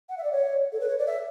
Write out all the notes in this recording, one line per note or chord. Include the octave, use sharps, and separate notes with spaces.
F#5
E5
D5
C#5
A4
B4
C#5
D5
E5